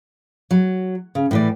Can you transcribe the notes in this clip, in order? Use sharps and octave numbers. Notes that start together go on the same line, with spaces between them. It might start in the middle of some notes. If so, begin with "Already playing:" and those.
F#3
C#3
A2 E3 D5